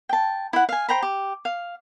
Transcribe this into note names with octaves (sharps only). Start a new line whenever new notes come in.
G5 A5
E4 F#5
F5 G#5
C5 G5 A#5 B5
G4
F5